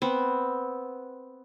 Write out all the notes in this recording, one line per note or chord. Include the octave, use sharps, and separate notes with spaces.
B3 C4